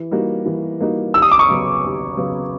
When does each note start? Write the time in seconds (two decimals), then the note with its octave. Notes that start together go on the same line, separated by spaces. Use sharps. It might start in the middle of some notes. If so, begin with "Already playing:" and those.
Already playing: E3
0.11 G3 A#3 D#4 F#4
0.46 E3
0.80 G3 A#3 D#4 F#4
1.14 D#2 E6
1.22 D#6
1.32 D6
1.39 C#6 D#6
1.49 C#3 F#3 B3
1.84 D#2
2.17 C#3 F#3 B3